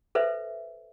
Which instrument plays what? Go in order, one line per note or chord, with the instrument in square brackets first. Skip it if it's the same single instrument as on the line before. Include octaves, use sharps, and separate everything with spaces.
[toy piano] A4 B4 C5 E5